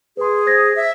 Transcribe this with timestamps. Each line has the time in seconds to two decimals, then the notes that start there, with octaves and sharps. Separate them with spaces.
0.17 G#4 B4 C6
0.46 C5 G#6 A#6
0.76 E5